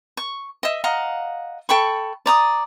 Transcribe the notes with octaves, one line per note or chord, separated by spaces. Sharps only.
C#6
D#5 E5
D#5 F5 F#5 A#5
A4 G5 B5 C#6
D5 A#5 D#6